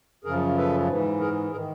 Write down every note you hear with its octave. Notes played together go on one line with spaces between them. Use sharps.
F#2 C#3 F3 G#4 A#4
A4 B4
G#2 E3
G#4 A#4
D#3 G#4 A#4